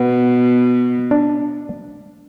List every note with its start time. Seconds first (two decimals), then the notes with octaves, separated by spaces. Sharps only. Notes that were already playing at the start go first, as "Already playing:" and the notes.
Already playing: B2 B3
1.11 D4